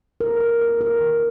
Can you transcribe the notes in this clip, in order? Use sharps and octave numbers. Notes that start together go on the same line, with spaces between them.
A#4
A#4
A#4
A#4
D#3